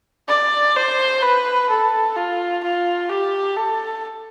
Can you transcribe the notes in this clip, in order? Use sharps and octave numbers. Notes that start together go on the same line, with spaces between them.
D5
C5
B4
A4
F4
F4
G4
A4